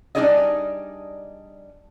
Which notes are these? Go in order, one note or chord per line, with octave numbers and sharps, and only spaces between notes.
G3 D4 D#4 G#4 D5 D#5